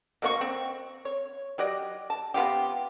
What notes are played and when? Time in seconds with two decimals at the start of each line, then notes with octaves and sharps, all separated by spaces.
0.22 B2 A#3 E4 C#6
0.41 C4
1.05 C#5
1.58 F#3 G4 D5 D#5
2.10 A5
2.34 C3 B3 F4 G4